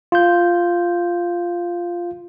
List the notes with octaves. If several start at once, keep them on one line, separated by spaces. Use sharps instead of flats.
F4 G6